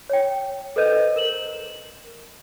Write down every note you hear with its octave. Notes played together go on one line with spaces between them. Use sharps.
C#5 G5
A4 B4 C5 D#5 G6 D#7
A#4 E7 F#7